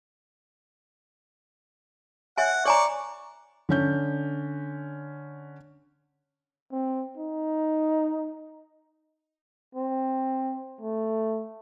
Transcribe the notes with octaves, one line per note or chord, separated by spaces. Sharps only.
C#5 E5 F#5 G#5
C#5 D5 G#5 A#5 C#6
D3 C#4 G6
C4
D#4
C4
A3